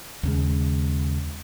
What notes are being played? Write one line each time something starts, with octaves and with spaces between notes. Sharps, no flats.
D#2 C#3 G#3